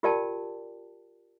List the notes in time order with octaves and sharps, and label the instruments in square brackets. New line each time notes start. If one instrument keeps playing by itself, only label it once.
[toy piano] F4 G4 A#4 D5 G5 A5